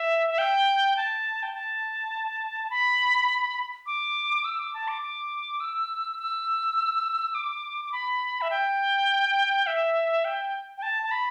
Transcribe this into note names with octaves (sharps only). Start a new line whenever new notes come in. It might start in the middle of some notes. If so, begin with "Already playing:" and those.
Already playing: E5
E5
G5
A5
G5
A5
B5
D6
E6
D6
A5
D6
D6
E6
E6
D6
D6
B5
E5
G5
E5
G5
G5
A5
A5
B5